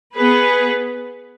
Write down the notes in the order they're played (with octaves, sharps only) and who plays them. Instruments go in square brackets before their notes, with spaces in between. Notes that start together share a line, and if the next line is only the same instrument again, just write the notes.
[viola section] B3 G#4 B4